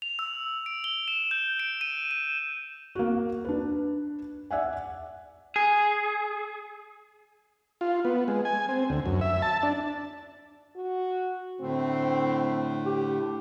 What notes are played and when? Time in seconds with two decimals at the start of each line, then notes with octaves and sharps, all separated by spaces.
0.02 F7
0.19 E6
0.66 D7
0.84 G7
1.08 E7
1.31 G6
1.60 D7
1.81 D#7
2.11 E7
2.95 A#3 F#4
3.45 D4 B4
4.51 D5 E5 F#5 G#5
5.56 G#4
7.81 F4
8.05 B3
8.28 G#3
8.45 G#5
8.69 C4
8.90 D2
9.06 F#2
9.21 E5
9.42 A5
9.63 D4
10.76 F#4
11.61 A2 D3 A3 C4
12.86 G4